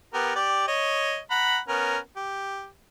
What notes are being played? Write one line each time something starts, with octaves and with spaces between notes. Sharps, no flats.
B3 G4 A#4
G4 D5
C#5 D#5
F#5 A#5 B5
B3 C#4 A#4
G4